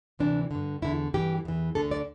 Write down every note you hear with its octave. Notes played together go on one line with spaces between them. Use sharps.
D2 C3 E3 D4
G2 D3
E2 D3 E4
G2 E3 G4
E2 E3
D2 D3 A4
D5